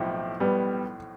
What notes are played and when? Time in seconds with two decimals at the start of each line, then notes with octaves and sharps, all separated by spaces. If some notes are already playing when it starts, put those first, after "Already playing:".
Already playing: B1 A2 F3 C4 E4 G4
0.40 G3 B3